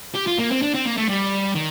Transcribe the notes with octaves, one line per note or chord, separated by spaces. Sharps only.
G4
F4
A#3
C4
D4
C4
A#3
A3
G3
D#3